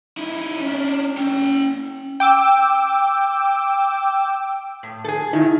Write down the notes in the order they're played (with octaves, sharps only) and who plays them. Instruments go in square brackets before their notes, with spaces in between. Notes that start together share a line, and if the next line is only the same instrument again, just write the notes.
[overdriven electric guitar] D#4 E4
C#4 D4
C#4 G5
[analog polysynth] G5 D6 E6
[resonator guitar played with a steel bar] A2
G#4 A4
[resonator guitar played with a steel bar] D#3 [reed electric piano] D#4 E4